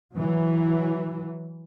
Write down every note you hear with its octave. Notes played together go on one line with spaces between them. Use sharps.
E3 F#3